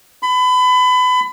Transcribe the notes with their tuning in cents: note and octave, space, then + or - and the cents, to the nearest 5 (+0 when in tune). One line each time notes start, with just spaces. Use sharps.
B5 +30